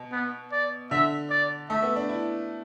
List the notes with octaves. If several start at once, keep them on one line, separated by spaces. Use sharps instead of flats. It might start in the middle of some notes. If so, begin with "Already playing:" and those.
Already playing: B2
B3
D5
D3 E5
D5
A3 E5
B3
D4
E4